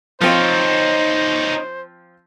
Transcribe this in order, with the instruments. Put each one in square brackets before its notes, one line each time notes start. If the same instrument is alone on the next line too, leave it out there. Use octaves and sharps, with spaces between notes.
[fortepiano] F3 C4 F4 [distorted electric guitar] D#4 C#5 [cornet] C5